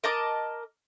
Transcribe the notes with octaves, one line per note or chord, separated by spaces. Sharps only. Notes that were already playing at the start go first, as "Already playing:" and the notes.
A#4 D#5 A5 D6